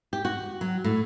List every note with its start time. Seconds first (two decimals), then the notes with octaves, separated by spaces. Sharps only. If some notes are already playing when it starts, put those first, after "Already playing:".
0.13 G4
0.25 F#4
0.61 F#3
0.84 A2